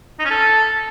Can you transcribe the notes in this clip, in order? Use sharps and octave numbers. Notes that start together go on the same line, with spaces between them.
D#4
C#4
A4